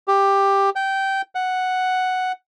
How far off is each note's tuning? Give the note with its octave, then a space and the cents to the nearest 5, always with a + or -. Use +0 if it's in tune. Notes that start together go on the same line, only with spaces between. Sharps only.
G4 +10
G5 -15
F#5 +0